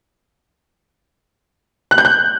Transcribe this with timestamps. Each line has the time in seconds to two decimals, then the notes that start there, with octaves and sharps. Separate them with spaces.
1.91 F#6
1.98 G6
2.05 F#6